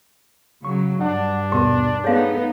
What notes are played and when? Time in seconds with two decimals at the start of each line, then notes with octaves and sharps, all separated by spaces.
0.65 C#3 F#3 C#6
1.01 G2 D4 F#5
1.52 D#2 B2 B3 G4 A#4
2.04 B3 D#4 G#4 A4 C#5 F5